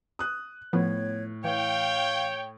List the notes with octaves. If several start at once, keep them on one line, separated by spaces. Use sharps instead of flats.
D#6 F#6
A2 F3 B3 C#5
E3 C#5 F5 G5